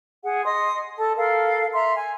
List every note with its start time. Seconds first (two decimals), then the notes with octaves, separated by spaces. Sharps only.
0.24 G#4 F#5
0.45 D#5 C6 D#6
0.97 A4 A5
1.17 A4 A#4 F5
1.73 E5 A#5 C6
1.96 G#5